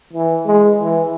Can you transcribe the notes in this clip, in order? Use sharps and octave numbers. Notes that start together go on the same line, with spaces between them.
E3
G#3
E3